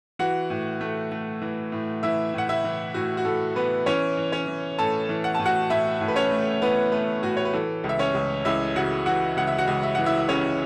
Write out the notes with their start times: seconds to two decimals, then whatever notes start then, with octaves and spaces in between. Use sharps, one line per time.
0.19 E3 F#4 F#5
0.50 A2
0.81 A3
1.12 A3
1.42 E3
1.72 A2
2.03 E3 E4 E5
2.34 A2 F#5
2.49 E4 E5
2.64 E3
2.94 A2 F#4
3.17 F#4
3.25 A2 A4
3.56 E3 B3 B4
3.86 E3 C#4 C#5
4.17 E3
4.32 C#4 C#5
4.47 E3
4.79 A2 A4 A5
5.09 E3
5.24 F#5
5.35 A2 A5
5.45 F#4 F#5
5.70 A2 E4 E5
6.01 A2
6.08 B4
6.16 C#4 C#5
6.31 A3
6.62 E3 B3 B4
6.92 A3 B3 B4
7.22 A2 F#4
7.37 C#5
7.45 B4
7.53 E3 A4
7.84 C#2
7.89 E5
7.99 C#4 C#5
8.14 C#2
8.45 C#2 E4 E5
8.76 C#3 F#4 F#5
9.06 E3 F#4 F#5
9.37 C#2 F#5
9.47 E5
9.58 F#4 F#5
9.68 C#2
9.83 E5
9.95 E3 F#5
10.06 E4 E5
10.19 E5
10.29 C#3 C#4 C#5